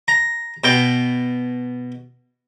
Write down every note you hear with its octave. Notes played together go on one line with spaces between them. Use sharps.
A#5
B2 G5